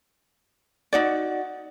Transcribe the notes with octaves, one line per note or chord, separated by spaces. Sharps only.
D#4 F#4 D5